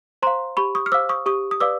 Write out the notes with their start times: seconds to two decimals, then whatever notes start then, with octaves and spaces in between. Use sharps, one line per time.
0.22 C5 F5 A#5 C6
0.57 G4 B5 C#6
0.75 C#6 D#6
0.86 F6
0.92 C5 F5 D6 E6
1.09 C#6 D#6
1.26 G4 C#6 D#6
1.51 D#6
1.60 B4 D5 F5 D6 E6